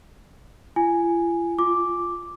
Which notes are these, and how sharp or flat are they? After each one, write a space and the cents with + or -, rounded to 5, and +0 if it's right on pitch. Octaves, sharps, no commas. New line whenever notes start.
F4 -45 G#5 +0
F4 +0 D6 +0